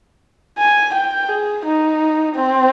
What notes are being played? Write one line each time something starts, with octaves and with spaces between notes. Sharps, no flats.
G#5
G5
G#4
D#4
C4